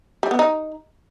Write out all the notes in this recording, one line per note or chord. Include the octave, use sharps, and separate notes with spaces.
G3
B3
D#4